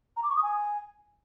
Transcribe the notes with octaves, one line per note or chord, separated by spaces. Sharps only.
A#5
D6
C#6
D#6
G#5